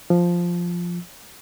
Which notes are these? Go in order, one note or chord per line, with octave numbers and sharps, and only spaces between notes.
F3